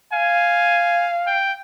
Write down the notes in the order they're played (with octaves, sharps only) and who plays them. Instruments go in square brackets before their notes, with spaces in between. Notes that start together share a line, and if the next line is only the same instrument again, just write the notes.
[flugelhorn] F5 [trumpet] G#5
[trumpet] G5